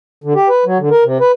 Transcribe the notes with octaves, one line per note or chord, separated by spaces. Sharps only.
D3
G4
B4
F#3
D3
A#4
C3
B4